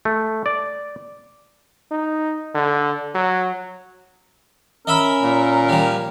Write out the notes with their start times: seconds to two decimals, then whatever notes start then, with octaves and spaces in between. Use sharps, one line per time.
0.05 A3
0.46 D5
1.91 D#4
2.55 D3
3.15 F#3
4.87 C#4 A#4 D#5 E5 B5
5.23 A#2
5.69 F3 G3